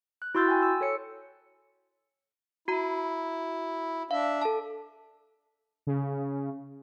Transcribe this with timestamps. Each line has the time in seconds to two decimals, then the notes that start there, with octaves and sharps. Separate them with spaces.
0.22 F#6
0.35 E4 F#4 C6 E6 G6 A6
0.48 G5 G#5
0.62 E6
0.81 A4 C#5 C#7
2.68 E4 F#4 A#5
4.11 D4 E5 F5
4.41 A4 A5
5.87 C#3